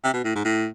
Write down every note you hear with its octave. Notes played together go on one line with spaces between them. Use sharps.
C3
B2
A2
G#2
A2